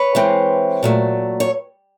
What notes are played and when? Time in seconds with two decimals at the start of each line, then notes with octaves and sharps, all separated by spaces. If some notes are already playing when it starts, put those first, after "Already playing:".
Already playing: B4 C#5
0.15 E3 G#3 C4
0.83 A#2 F#3 A3
1.40 C#5